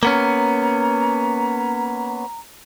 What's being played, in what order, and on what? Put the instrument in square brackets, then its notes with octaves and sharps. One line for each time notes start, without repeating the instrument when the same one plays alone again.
[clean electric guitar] A#3 B3 C#4 [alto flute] A#5